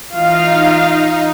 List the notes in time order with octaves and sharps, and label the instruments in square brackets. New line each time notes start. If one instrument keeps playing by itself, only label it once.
[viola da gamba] E3 F4 [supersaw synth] D#4 [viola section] F5